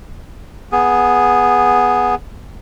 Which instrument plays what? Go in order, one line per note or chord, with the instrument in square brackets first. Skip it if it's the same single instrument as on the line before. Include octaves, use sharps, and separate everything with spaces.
[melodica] B3 G#4